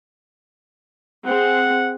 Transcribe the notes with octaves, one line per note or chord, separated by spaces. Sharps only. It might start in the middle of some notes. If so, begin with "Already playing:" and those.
C4 G#4 F#5